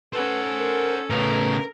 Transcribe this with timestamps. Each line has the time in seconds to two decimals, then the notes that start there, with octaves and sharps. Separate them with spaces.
0.13 C#4 A4 B4 C5 F#5
0.58 A#4
1.10 A2 C#3 A#4 B4